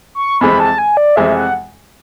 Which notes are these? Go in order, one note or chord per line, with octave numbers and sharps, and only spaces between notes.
C#6
F2 C3 E3 G#3 C4 B5
A5
G#5
D5
F2 C3 E3 G#3 C4 E5
F#5